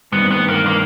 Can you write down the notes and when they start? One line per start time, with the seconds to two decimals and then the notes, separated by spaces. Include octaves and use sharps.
0.12 G2 D#3 G3 B3 C4
0.31 B3
0.48 A#3
0.66 A#3